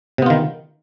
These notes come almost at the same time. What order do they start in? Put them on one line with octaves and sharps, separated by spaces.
C3 B3 F4 D#3